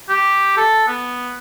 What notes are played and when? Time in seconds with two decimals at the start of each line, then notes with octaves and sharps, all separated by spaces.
0.09 G4
0.57 A4
0.88 B3